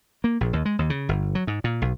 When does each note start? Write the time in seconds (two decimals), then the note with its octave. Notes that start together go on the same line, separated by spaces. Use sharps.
0.24 A#3
0.41 A#1
0.53 D#2
0.65 G#3
0.79 D#2
0.90 C#3
1.09 G1
1.35 F#3
1.47 G#2
1.64 A#2
1.82 B1